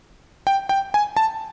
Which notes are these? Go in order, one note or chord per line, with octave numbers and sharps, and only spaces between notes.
G5
G5
G#5
A5